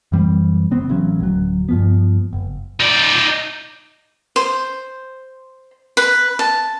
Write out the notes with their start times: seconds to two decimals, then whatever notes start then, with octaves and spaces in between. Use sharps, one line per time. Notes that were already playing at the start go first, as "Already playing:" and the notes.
0.12 F#2 E3 G3 C4
0.71 C#3 B3 C4
0.89 A1 A2 F#3 C#4
1.20 D1 F#3
1.69 G2 F3 B3
2.33 F#1
2.80 D#4 D5
4.36 C5
5.97 B4
6.39 A5